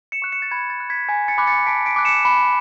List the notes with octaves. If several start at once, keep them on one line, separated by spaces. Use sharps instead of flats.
C#7 E7
C#6 F#6
C#7 E7
A6
B5 G#6
A6
F#6
G#6 B6
G#5 G#6 B6
A6 C#7
B5 D6 F#6
A6 C#7
A5 B6 D7
B6 D7
D6 F#6
C#7 E7
B5